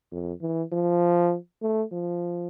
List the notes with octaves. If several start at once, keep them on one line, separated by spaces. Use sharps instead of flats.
F2
E3
F3
A3
F3